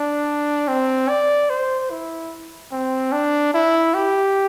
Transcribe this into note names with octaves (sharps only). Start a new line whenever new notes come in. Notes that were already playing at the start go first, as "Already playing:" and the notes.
Already playing: D4
C4
D5
C5
E4
C4
D4
E4
G4